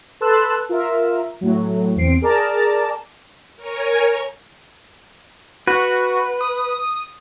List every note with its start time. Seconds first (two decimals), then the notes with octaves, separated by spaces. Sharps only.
0.21 A4 B4 A5 C6 E6 F#6
0.69 F4 A#4 E5
1.41 A2 F#3
1.96 E2 C4 C7 D7
2.22 G#4 A#4 D5 A5 A#5
3.57 A#4 C#5 G#5
5.67 F#4 B4
6.41 D#6